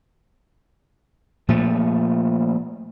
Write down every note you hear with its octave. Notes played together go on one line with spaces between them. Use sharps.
A#2 F3 A3